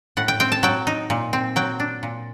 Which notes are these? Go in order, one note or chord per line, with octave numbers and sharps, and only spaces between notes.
A2 F#5
G5
C4 G5
A5
F#3 G5
D#4
A#2
C4
F#3 G5
D4
A#2